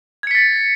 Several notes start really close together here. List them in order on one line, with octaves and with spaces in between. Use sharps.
G#6 C#7 B6 A6